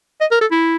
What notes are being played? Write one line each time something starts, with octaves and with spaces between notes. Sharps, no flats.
D#5
A#4
A4
E4